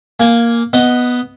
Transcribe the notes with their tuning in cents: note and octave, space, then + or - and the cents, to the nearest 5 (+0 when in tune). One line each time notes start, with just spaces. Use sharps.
A#3 +0 G#5 +0
B3 +0 D#5 +5